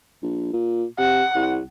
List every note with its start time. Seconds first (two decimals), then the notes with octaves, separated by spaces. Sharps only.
0.23 A#1
0.53 A#2
0.99 C3 F#5
1.35 C2